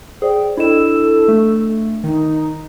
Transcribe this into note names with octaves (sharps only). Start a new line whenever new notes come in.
G#4 C5 D5 G5
D4 E4 A4 D#5 E7
A3
D#3 D#4